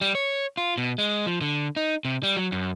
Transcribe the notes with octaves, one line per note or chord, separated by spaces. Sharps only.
G3
C#5
F4
B2
G#3
F3
D3
D#4
C3
G3
F#3
F#2